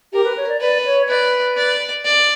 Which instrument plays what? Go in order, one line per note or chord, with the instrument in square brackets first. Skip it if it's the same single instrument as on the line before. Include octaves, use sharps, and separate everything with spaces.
[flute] G4 [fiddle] A#4
[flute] B4
C#5
D5
[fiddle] B4 [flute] D5
[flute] C#5
[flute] B4 [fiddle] D5
[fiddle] D5
D5